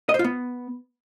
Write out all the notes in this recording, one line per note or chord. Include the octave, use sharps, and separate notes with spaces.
D#5
C5
F4
B3